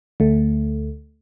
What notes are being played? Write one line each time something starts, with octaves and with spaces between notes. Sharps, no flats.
D2 A3